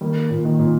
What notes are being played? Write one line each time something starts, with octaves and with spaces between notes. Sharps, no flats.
D#3 G3 A#3
A#2
D#3
A#2